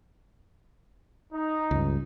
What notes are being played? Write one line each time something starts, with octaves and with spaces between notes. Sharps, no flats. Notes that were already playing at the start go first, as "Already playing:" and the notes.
D#4
C#2 G2